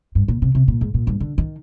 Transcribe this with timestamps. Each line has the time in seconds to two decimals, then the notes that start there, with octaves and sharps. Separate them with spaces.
0.15 G2
0.28 A#2
0.42 C3
0.55 C3
0.68 A#2
0.81 G#2
0.94 A#2
1.07 G2
1.20 D3
1.38 D#3